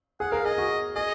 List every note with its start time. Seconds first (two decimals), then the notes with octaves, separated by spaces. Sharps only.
0.20 G#4 F#5
0.32 A#4 F5
0.45 G#4 D#5
0.58 F#4
0.96 G#4 D#5